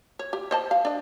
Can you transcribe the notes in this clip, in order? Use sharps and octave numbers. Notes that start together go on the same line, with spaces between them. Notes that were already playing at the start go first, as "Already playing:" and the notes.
C#5
G4
C5 D#5 A5
F5
D4 D#5